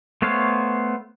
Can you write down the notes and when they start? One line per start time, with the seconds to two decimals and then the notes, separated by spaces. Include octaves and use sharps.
0.22 A3 B3 C5 C#5 F5